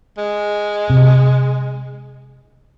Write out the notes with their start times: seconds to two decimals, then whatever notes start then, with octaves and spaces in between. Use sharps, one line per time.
0.18 G#3
0.90 C3